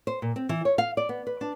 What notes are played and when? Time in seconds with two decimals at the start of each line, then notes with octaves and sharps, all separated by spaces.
0.07 C5
0.22 A#2
0.36 C4
0.49 E3
0.65 C#5
0.78 F5
0.97 D5
1.09 B3
1.27 B4
1.41 D4